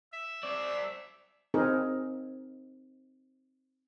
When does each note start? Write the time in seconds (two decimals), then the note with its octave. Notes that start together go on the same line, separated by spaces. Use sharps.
0.13 E5
0.43 C4 D5
1.54 C4 D#4 G#4 A#4